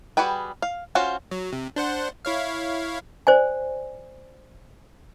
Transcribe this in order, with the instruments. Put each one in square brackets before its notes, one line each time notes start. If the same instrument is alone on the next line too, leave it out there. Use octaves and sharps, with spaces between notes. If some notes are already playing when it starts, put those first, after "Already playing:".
[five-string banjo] G3 F#4 G#4 B4 G5
F5
C#4 F4 F#4 C5 F#5
[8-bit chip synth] F#3
C3
D4 C5 F#5
E4 C#5 F5
[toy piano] C5 D5 G#5